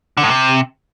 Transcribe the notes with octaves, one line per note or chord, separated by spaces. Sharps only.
D3
A2
C3